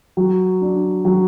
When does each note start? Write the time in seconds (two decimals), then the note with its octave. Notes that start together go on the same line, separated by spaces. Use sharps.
0.17 F#3
0.61 D4
1.05 F#3